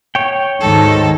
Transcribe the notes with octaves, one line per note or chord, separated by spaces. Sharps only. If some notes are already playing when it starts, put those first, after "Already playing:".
C#5 G5
D2 G#2 D#3 A4